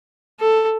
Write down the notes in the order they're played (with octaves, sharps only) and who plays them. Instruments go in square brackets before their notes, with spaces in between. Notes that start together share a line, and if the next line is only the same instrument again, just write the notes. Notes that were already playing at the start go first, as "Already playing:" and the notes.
[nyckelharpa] A4